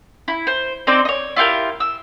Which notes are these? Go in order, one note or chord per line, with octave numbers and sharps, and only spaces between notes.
E4
C5
C4 D#4 C5 D5
C#5 D#5
E4 F4 G4 A#4
E6